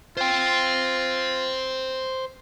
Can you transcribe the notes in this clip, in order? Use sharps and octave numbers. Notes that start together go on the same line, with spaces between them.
F4 C5 G5